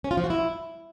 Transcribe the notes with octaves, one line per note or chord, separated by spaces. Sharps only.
C#4
F4
F3
F#4
E4